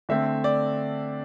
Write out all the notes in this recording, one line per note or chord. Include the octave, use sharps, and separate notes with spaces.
D3 A3 C4 E5
D5